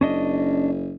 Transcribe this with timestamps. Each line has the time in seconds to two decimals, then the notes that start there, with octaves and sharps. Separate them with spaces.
0.01 F#1 C#4 D4 D#5